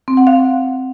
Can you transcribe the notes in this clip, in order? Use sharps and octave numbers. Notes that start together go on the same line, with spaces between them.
C4
F#5
F5